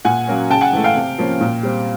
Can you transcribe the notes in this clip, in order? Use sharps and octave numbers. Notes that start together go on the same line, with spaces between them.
A#2 F#5 G#5
F#3 A#3 C#4
C#3 G5 A5
F#5 G#5
E3 A3
F5 G5
C3
F3 A#3 C#4
A#2
G3 C4